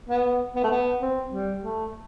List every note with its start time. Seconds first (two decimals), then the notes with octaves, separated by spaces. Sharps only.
0.09 B3
0.56 B3
0.64 A3
0.71 B3
1.02 C4
1.33 G3
1.64 A3